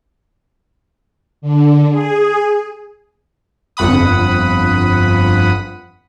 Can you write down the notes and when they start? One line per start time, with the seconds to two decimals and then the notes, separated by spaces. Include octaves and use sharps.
1.42 D3
1.91 G#4
3.77 G1 F2 F#5 B5 D#6